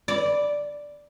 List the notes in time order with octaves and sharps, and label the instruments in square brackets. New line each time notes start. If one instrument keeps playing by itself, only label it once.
[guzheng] D5